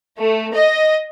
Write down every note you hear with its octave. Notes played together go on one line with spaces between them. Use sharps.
A3
D#5